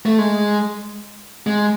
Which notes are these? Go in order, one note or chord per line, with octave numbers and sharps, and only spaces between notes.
A3
G#3
G#3